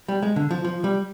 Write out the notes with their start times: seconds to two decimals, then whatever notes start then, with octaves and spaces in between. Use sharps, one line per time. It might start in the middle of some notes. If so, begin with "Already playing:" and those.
0.08 G3
0.23 G#3
0.36 D3
0.51 F3
0.64 F3
0.84 G3